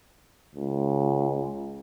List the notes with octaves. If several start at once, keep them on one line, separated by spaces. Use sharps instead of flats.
C#2